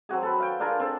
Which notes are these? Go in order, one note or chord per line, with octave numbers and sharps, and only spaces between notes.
F#3 C4 F#4 G#4
A4 B4
F5 G5
D4 F4 G#4 A#4
C4 A4